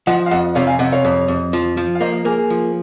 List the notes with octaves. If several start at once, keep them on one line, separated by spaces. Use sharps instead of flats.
F3 D#5 F#5
F5
F2 D#5 F#5
C3 C#5 F5
F5 G#5
C3 D#5 F#5
C#5 F5
F2
F2
F3
F3
F5
A#3 C5 D#5
A#4
A#3 G#4
G#4
F3